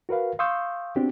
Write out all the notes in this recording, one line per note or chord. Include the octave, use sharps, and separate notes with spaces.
F#4 A#4 B4 F5
F5 C6 C#6 D#6 E6 G6
B3 C4 D4 F#4 G4